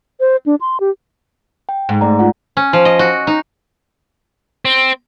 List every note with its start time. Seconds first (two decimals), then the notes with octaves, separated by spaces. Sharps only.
0.20 C5
0.46 D4
0.61 C6
0.80 G4
1.69 G5
1.89 G#2
2.01 A3 D5 A#5
2.19 F4 F#5
2.57 C#4
2.73 F3
2.85 D#5
2.99 F#4
3.27 D#4
4.65 C4